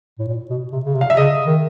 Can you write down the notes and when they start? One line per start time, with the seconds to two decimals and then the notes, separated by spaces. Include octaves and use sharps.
0.19 A2
0.28 A#2
0.50 B2
0.72 C3
0.85 C#3
0.95 C3
1.01 F5
1.10 E5
1.17 C#3 D#5
1.47 D#3